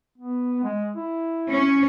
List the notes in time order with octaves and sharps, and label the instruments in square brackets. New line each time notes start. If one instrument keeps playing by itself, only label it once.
[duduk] B3
G#3
E4
[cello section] C#4